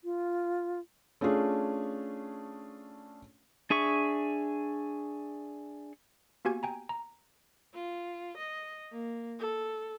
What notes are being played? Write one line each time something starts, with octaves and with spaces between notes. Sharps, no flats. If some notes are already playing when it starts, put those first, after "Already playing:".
F4
A3 C#4 D4 F4 G#4
D4 G#4 E5 C#6
A#3 B3 F#4 G4 G#5 G#6
G5 G#5 A#5
A#5
F4
D#5
A#3
A4